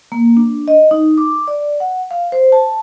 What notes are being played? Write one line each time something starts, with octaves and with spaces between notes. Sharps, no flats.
A#3
D4
D#5
D#4
D6
D5
F#5
F5
C5
A5